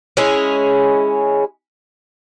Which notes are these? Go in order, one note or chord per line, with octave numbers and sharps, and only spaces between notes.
G#3 C#4 E4 G#4